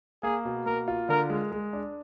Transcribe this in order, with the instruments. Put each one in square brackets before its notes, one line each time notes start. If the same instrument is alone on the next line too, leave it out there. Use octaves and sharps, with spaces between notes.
[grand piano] A#3 [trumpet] G#4
[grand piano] B2
[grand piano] A#3 [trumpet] A#4
[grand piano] F4
[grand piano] D3 [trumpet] A#4
[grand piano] G#3
G#3
D4